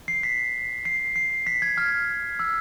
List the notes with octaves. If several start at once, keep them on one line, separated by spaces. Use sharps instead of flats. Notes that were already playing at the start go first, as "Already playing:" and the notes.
C7
B6
C7
C7
B6
G#6
F6
E6